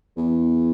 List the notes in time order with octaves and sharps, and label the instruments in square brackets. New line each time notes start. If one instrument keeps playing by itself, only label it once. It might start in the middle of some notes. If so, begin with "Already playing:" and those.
[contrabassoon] E2